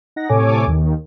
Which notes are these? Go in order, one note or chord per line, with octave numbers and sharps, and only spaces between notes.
D#4 F#5 A#6
A2 C3 A4 C#5 G#5 D6
D#2 D#3